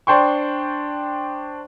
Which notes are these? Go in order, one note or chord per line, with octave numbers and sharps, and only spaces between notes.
D4 C5 G5 C6 C#6